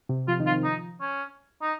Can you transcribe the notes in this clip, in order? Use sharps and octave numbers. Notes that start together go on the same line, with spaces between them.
C3
F3 F4
D#3
F4
F3
D#4
C#4
D#4